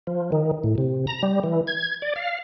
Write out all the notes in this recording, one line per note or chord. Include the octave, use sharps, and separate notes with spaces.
F3
D#3
A2
C3
A#5
G3
E3
G#6
D5
F5